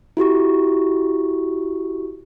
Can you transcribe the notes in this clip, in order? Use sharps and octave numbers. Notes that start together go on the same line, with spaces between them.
E4 F#4 G4 C#6